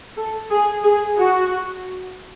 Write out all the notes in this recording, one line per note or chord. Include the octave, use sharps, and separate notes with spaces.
A4
G#4
G#4
F#4